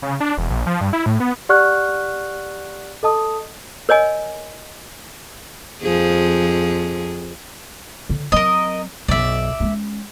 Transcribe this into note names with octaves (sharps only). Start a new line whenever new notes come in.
C#3
D4
E1
A#1
F3
G2
E4
A2
B3
G4 D5 F#5 C#6 F6 F#6
A4 D#5 A5 D#6
A#4 C#5 D#5 G#5
F2 F3 G#4
D3
F#3 C4 A#4 D#5
B1 F#2 D5 E5
G#3 C#4